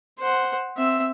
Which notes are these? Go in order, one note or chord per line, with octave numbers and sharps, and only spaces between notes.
C5 F#5
C4 E5